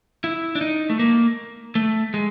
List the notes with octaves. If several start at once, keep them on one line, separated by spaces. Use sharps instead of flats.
E4
D4
D#4
A3
A#3
A3
G#3